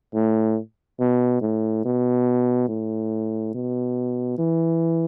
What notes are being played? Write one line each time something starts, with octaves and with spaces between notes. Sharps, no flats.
A2
B2
A2
B2
A2
B2
E3